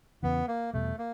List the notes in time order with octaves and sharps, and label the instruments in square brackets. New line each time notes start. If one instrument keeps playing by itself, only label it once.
[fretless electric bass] E2 C#3 E3 [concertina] B3
[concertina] A#3
[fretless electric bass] E2 B2 G3 [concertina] A3
[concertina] A#3